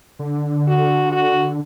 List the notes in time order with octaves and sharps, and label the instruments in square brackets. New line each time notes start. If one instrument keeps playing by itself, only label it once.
[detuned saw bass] D3
[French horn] F#4
F#4